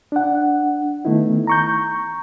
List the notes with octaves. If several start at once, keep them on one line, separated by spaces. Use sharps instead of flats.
D4 F#5
D#3 A3 B3 D#4 E4
A#5 C#6 G6